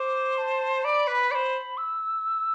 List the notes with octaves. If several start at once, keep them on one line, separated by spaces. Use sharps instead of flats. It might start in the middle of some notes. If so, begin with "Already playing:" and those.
Already playing: C5 D6
A5
D5 B5
B4
C5 D5 B5
E6